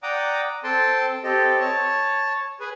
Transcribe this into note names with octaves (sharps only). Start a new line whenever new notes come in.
D5 F#5 G5 A#5 D6 D#6
C4 A4 G5 A5 C6
C4 G4 A4 D#5
C#5 A5
G#4 B4 G#5